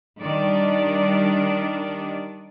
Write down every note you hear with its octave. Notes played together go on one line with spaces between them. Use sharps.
D#3 G3 D4 D5